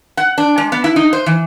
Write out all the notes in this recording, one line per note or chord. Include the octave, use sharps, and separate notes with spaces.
F#5
D4
G#3
B3
E4
D#4
C5
E3